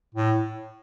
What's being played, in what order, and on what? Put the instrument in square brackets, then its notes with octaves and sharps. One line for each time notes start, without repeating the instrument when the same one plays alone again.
[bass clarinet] A2